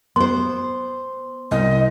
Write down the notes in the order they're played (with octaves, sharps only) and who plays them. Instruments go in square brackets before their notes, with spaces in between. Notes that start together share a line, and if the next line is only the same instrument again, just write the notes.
[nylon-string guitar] B3 C5 [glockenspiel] C6
[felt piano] C2 [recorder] D#5